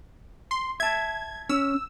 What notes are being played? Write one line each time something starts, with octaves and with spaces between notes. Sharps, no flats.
C6
E5 A5 G#6
C#4 E6